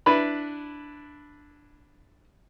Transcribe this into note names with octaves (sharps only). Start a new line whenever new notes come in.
D4 E4 B4 B5